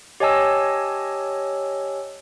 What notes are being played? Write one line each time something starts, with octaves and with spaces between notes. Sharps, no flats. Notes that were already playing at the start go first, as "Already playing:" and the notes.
G4 C#5 D#5 G#5 A5 E6